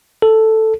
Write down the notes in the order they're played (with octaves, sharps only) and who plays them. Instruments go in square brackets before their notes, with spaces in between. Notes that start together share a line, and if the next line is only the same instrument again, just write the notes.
[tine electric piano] A4